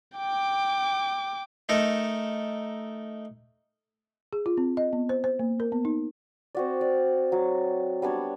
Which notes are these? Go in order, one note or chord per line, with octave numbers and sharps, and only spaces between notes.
G5 D6
A3 D#4 A4 A#4
G#4
F4
C4
D#5
B3
C5
C5
A#3
A#4
B3
D#4
C4 F#4 D5
D5
F#3
G3 B3 D4 C#5